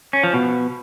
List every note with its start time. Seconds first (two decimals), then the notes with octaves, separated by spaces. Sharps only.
0.13 C#4
0.23 F3
0.34 B2